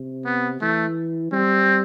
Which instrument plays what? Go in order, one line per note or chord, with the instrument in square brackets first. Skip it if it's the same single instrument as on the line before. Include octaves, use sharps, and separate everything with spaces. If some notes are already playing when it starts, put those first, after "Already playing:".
Already playing: [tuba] C3
[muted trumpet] B3
[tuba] E3 [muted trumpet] A3
[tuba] G3 [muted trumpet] C4